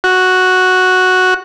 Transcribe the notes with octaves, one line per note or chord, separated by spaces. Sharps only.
F#4